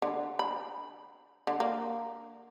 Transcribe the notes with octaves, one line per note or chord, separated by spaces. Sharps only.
D3
B5
D3
A#3